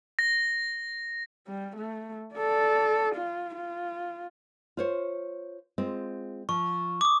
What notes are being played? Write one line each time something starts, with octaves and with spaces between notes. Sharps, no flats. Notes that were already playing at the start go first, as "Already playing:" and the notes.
A#6
G3
A3
A4 D5
F4
F4
F4 C5 C#5
G#3 C4 F4
F3 C#6
D6 D#6